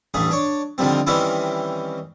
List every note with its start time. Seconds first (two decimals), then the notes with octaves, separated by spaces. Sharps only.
0.14 A1 G2 A3 G#4
0.31 D4 C#5
0.78 D3 D#3 F3 G3 C4
1.07 D#3 E3 G3 C4 C#4 E4